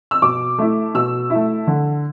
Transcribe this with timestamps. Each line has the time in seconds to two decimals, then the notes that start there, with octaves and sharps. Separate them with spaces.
0.11 E6
0.22 B2 D6
0.58 A3 E4
0.94 B2 E6
1.30 E4
1.35 A3
1.67 D3